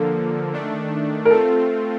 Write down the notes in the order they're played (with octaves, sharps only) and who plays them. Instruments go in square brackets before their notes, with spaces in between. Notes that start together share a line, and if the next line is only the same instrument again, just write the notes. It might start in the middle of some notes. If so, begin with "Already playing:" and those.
Already playing: [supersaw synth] D3 F3 A#3 [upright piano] A4
[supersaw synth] D#3 A3 D4
[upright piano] A#4
[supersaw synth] A3 C4 F4 [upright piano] A4